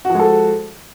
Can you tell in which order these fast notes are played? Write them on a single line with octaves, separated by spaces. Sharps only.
F#4 F3 G#3 A4